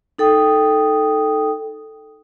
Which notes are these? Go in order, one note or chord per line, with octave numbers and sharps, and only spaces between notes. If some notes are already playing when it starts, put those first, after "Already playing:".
D#4 A4 G5 D#6